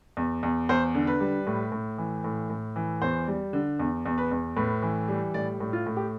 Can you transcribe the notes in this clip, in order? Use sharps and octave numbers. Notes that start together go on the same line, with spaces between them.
E2
E2
E2 C5
D3
B4
G3
A2
A2
E3
A2
A2
E3
E2 C5
G3
D3
E2
E2
B4
E2
A2 B4
E3
G3
A2 D5
A2
F4
A2
G4